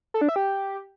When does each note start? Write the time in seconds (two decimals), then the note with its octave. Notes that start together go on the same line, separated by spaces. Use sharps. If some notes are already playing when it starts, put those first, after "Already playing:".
0.14 A4
0.21 D4
0.29 E5
0.36 G4